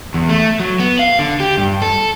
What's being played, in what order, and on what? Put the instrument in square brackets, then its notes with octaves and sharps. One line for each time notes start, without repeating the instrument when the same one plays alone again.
[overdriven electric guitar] E2
A3
F#3
B3
F5
D3
G4
G2
A4